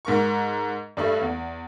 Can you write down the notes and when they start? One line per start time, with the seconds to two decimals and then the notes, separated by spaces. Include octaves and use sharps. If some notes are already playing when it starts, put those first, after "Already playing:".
0.05 G#2 A#4 C#6
0.97 G2 G3 A3
1.21 E2